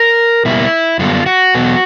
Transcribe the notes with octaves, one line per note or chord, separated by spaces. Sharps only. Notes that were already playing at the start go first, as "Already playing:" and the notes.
Already playing: A#4
B2 G3 A#3 E4
F#2 D3 G3 B3 F4
F#4
E2 B2 F#3 B3